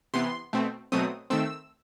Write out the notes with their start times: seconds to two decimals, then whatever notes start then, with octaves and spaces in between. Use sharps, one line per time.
0.14 C3 E3 B3 C6
0.53 B2 A3 C4
0.92 B2 F#3 A3 C4 D#6
1.30 D#3 A3 C4 E6